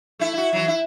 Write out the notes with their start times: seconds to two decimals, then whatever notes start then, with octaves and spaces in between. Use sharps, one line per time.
0.19 A3 E4
0.34 E4 F#4
0.53 E3 F#3
0.68 E4